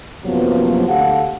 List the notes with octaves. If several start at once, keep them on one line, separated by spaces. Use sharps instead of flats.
F#2 C3 F3 F#3 A#3 B3
D2 G4 A4 F5 F#5